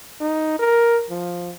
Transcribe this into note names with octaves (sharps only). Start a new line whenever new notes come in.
D#4
A#4
F3